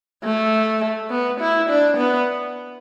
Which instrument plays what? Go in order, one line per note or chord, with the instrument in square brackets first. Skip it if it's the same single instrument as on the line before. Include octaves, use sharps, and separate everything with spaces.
[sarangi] A3
B3
E4
D4
B3